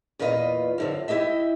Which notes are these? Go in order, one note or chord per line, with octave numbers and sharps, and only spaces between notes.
E2 A#2 F4 B4 D#5
F#2 D3 F3
E4 G4 D#5 E5